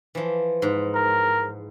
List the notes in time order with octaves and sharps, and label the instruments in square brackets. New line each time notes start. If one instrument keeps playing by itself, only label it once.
[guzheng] E3 F3
G#2
[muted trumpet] A#4